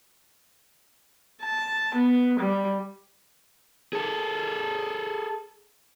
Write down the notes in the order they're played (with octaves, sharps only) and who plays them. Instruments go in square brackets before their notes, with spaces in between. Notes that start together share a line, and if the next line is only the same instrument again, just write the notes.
[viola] A5
B3
G3
[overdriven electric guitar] G#4 A4